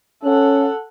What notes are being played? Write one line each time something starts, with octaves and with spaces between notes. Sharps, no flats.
C#4 A4 F#5